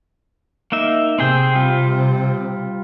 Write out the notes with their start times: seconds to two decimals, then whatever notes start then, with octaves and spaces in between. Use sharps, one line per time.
0.72 A#3 D#4 E5
1.19 C3 C4 G#4 G5
1.55 G3 F4